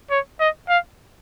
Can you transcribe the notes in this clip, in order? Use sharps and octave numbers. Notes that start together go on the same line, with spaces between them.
C#5
D#5
F5